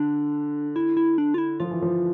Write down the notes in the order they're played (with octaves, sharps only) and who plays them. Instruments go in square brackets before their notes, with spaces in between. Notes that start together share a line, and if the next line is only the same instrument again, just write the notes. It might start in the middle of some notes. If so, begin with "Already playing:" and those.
Already playing: [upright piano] D3 [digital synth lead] D4
[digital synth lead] E4
E4
D4
F4
E4
[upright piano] F3 [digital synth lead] F4
[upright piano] E3
F3